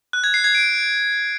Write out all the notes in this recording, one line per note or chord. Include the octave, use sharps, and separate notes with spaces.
F#6
G#6
C7
G#6
D7